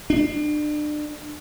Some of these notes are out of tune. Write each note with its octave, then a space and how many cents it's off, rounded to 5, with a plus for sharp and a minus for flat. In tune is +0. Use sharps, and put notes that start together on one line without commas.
D4 +30